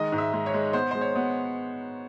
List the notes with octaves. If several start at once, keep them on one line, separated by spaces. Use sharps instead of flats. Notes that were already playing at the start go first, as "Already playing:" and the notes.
Already playing: D#3 G#3 D#5
G#2
E5
G#3
C#5
G#3
B3 C5
G#3 C5
C#5
B3